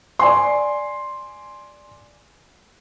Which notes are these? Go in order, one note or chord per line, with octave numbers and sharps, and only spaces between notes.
D5 G#5 C6